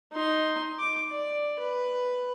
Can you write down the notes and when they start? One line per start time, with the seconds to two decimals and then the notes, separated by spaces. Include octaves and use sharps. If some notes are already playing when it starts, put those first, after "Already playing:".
0.13 D#4 C6
0.79 D6
1.11 D5
1.59 B4